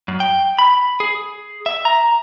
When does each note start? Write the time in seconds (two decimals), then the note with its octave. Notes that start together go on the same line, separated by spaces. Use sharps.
0.08 F#2
0.20 G5
0.58 B5
1.00 G#4
1.66 E5
1.85 A#5